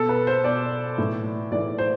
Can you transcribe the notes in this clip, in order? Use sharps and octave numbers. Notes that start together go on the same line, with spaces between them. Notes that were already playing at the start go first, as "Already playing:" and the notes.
Already playing: B2 A4
B4
C5
B2 D5
A2 E3
A2 E3 D5
C5